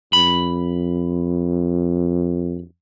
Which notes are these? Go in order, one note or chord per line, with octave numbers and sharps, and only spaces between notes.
F2 B5